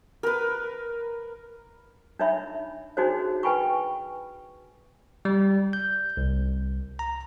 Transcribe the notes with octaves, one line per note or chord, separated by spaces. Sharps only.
A#4 B4
D4 D#4 C#5 E5 B5
D4 D#4 F#4 G#4 C5 C#5
B4 G5 G#5 B5 C#6
G3
G6
C2
A#5